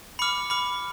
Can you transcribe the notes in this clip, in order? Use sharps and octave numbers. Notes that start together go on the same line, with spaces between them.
B5 D6 F6 C#7
B5 D6 F6